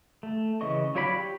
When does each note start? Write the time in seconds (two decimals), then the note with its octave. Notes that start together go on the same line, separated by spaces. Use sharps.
0.23 A3
0.61 C#3 E3 D#5 C#6
0.95 F#3 F4 C#5 D5 B5
1.16 G4